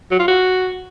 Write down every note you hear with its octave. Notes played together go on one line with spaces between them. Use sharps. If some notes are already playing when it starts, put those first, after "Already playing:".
F#3
F4
F#4